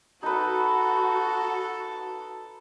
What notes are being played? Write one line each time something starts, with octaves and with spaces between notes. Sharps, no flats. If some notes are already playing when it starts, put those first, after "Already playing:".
D#4 F#4 A4 B4